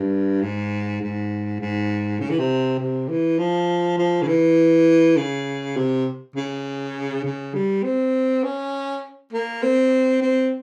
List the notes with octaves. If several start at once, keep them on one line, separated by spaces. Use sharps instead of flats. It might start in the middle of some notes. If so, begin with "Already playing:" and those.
Already playing: G2
G#2
G#2
G#2
C#3
E3
C3
C3
E3
F3
F3
C#3
E3
C#3
C3
C#3
C#3
G3
C4
C#4
A#3
C4
C4